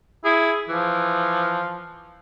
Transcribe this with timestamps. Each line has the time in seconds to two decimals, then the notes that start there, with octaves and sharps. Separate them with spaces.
0.25 E4 G#4
0.69 E3 F3